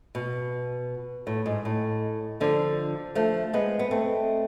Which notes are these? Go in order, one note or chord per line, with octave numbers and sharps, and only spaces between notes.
B2
A2
G#2
A2
D3 F3
F3 A3
G#3 B3
B3
A3 C4